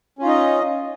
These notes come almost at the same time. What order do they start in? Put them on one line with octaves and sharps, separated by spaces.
C#4 F4 D#4 D#5